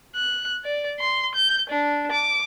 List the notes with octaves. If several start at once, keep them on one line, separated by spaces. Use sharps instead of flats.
F#6
D5
C6
G6
D4
D6